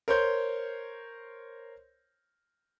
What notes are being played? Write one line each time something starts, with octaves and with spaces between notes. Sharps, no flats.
A#4 C5 C#5 C6 G6